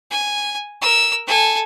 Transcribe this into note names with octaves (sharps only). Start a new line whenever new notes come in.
G#5
A#4 E6
A4 G#5